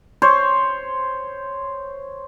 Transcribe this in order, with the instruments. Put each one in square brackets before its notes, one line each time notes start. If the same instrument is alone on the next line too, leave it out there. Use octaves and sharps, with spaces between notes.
[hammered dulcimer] C5 C#5